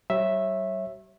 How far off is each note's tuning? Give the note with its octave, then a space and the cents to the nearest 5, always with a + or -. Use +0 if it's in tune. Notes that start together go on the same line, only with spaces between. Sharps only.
G3 -45 C#5 -30 E5 +0